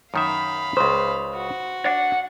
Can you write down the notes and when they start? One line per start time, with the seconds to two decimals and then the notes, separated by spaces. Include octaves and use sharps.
0.14 F#2 D#3 E5 F5 B5
0.77 C#2 C#3 C5
1.34 F#4
1.86 D4 F#5